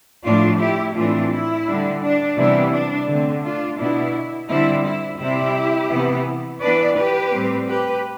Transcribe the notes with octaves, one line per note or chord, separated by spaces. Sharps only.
A2 F3 A3 D4 F4
E4 G4
A2 E3 A3 C4 D4 F4
E4
D3 G3 D4
D4
C3 E3 G3 B3 D4 E4
D4
D3 A3 C4
D4 F4
B2 B3 D4 E4
D3 G3 C4 E4
E4
C3 G3 C4 E4 G4
C3 E3 B3
E3 B3 D4 B4 D5
G4 B4
A2 G3 C4
G4 B4